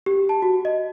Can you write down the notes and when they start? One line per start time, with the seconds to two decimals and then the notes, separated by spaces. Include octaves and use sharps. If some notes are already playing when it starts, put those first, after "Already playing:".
0.06 G4
0.29 A5
0.42 F#4
0.65 D#5